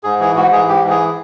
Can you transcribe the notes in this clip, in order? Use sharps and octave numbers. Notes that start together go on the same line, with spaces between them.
G#2 G#4
E3 G#4
G#2 F#4
E3 G#4
G#2 G4
E3
G#4